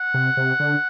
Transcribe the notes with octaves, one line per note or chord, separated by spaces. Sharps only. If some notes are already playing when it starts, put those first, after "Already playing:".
Already playing: F#5
C3
C3
D3